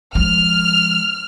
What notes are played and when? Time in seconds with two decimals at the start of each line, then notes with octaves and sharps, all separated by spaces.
0.15 F3 G#3 F6